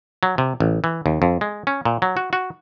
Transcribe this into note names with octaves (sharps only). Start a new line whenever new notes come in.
F#3
C3
A1
E3
D#2
F2
G#3
C#4
A#2
F#3
F#4
F#4